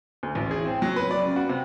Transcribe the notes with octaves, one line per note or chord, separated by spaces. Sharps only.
D2
A1
G#4
C4
F#3
B4
D5
C#3
F#4
C3